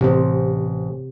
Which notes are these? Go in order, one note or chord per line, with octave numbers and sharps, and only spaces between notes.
A1 C3 C4